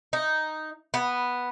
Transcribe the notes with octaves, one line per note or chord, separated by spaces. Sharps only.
D#4
B3